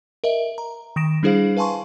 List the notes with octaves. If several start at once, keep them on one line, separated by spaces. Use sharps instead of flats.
A#4 D#5 E5
A#5
D#3 D#6 A#6 D7 E7
G3 D4 E4 G#4 C5 F5
B4 F5 G#5 A5 C6 C#6